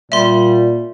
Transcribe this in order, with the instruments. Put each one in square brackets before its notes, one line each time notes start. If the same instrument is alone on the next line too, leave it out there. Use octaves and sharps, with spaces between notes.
[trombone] A#2 [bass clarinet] G3 [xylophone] E5 C6